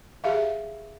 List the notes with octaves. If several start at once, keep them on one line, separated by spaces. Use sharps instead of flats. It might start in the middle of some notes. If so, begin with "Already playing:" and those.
G4 G#4 E5 F5